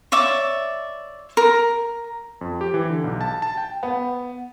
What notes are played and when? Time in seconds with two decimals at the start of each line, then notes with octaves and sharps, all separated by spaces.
0.12 C#5 D5 E5 D6
1.37 A#4
2.41 F2
2.61 G4
2.74 E3
2.90 D3
3.04 B1
3.21 A5
3.42 A5
3.57 G5
3.83 B3